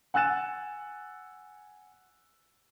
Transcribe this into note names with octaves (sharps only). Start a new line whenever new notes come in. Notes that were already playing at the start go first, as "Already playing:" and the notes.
F#5 G#5 E6 F#6 A6 E7